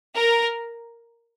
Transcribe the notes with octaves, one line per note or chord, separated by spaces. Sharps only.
A#4